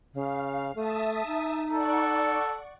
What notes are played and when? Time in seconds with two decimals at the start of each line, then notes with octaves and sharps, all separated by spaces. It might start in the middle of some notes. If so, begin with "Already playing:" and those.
0.14 C#3 F5
0.75 A3 E5 A5 D#6
1.26 D#4
1.72 A4 D5 F#5 C#6